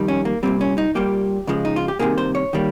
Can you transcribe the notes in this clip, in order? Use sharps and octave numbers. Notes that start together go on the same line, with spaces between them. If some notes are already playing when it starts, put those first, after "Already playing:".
Already playing: F2 D#3 G3
C#4
A#3
C2 A#2 G3 C4
C#4
D#4
A#2 G3 A#3 G4
C#2 C#3 F3 G#3
D#4
F4
G4
C2 C3 D#3 A#3 G#4
C5
C#5
D#3 G3 A#3